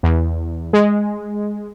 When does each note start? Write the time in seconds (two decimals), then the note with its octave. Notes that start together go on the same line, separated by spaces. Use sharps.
0.03 E2
0.73 G#3